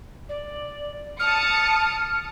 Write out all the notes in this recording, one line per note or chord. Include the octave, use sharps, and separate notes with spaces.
D5
A5 D#6 F6 C#7